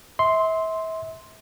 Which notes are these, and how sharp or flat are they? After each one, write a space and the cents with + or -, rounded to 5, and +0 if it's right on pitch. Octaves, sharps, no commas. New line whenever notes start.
E5 -35 C6 +0